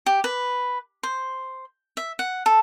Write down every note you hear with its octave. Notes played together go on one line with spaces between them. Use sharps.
G4
B4
C5
E5
F#5
A4